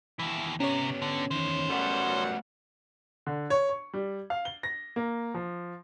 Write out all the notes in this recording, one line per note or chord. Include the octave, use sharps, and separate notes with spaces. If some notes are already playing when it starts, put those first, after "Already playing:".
D#2 E3 E4
C3 B3 C#4 G4 C#5
D3
E2 D#3 E4 C5
F#2 G3 A3 B3 F#5
D3
C#5
C#6
G3
F5
G7
A#6
A#3
F3